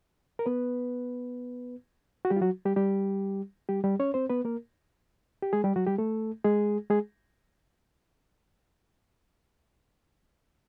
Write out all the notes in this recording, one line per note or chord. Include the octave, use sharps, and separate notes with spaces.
A#4
B3 B4
F#4
G3 G4
F4
F#3 F#4
G3 G4
G3 G4
G3 G4
G3 G4
C#4 C#5
C4 C5
B3 B4
A#3 A#4
G4
G#3 G#4
G3 G4
F#3 F#4
G3 G4
A3 A4
G#3 G#4
G#3 G#4